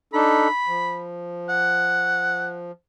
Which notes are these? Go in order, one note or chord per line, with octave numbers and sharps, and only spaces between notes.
D4 D#4 A4 B5
F3
F#5